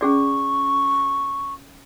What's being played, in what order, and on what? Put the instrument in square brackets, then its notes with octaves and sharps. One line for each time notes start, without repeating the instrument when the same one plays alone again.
[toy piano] C#4 G#4 D5 [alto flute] C#6